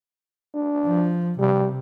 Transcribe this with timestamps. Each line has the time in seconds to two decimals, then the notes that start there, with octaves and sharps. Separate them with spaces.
0.54 D4
0.86 F3
1.39 C3 G3